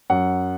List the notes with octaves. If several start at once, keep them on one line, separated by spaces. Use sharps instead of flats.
F#2 F#5